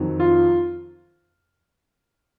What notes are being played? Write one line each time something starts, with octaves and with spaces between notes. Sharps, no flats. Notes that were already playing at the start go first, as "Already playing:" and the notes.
Already playing: F2 D#3 F#3
F4